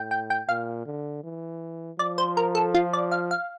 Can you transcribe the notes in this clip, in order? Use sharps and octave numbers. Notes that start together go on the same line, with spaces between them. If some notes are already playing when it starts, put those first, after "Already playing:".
Already playing: A2 G5
G5
G5
A#2 F5
D3
E3
F3 D5
C5
A#4
A4
F4
D5
F5
F5